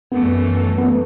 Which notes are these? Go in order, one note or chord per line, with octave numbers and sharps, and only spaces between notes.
F#2 E3 A3 B3
B3
A3